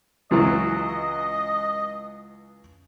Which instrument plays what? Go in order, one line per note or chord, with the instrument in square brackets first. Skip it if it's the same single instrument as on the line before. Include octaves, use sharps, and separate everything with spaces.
[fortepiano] C#2 E3 F#3 [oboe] D#5